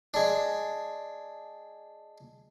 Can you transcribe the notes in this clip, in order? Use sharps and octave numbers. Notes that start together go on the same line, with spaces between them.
G#3 D4